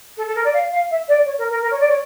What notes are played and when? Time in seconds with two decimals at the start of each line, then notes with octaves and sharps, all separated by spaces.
0.17 A4
0.27 A4
0.35 A#4
0.44 D5
0.53 F5
0.72 F5
0.90 E5
1.08 D5
1.25 C#5
1.38 A#4
1.50 A#4
1.62 A#4
1.71 C#5
1.80 D5
1.89 C#5